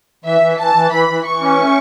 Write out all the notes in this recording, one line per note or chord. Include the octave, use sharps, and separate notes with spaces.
E3 E5
E3
E3 A5
E3
E3 B5
E3
E3 C#6
C#4
A3